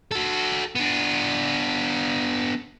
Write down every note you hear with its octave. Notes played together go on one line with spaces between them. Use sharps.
F#4 A4
B3 D4